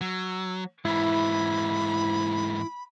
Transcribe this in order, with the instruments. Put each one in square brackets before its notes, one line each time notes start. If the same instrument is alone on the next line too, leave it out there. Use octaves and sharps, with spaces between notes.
[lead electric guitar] F#3 [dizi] E6
[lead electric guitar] G#2 E3 [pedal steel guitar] E4 [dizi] B5